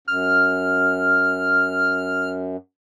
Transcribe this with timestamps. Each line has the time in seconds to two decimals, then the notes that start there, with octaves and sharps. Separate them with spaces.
0.08 F#2 F6